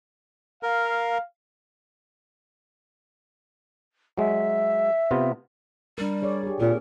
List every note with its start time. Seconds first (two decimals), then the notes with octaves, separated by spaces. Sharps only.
0.63 A#4 F5
4.18 F#3 G#3 E5
5.11 C3 B3 F4
5.98 G3 D4 A#4
6.22 G#4 C#5 D5
6.43 G4 G#4
6.60 A#2 A#3 C4 G#4 A#4